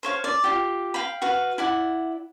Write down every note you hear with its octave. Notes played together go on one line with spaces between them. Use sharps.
C5 C#5 F5
D5
F4 G4
F5 G5 B5
F#4 B4 F5
E4 D5 F#5